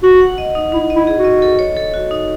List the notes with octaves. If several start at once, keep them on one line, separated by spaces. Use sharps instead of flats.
F#4 F#5
F#5
D#5
D#4
D#4 E4
D#5
E4
G#4
F#4
D#5
A4
C#5
A4
F#4
D#4